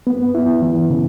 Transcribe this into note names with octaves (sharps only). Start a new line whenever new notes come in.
B3
E4
E3
C#3